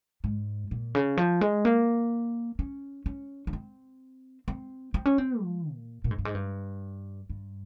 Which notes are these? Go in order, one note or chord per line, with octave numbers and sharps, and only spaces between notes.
G#2
A#2
C#3
F3
G#3
A#3
C#4
C#4
C#4
C4
C4
C4
C#4
C4
F3
A#2
A#2
G#2
G2
G#2
G2
G2